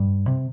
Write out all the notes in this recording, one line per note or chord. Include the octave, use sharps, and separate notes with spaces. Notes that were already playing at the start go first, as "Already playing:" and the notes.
Already playing: G2
C3